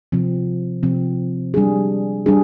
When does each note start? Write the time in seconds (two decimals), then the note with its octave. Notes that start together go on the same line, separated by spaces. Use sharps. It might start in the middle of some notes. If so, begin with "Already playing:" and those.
0.12 C3 F3 C4
0.83 C3 F3 C4
1.54 G3 D4 G#4
2.26 G3 D4 G#4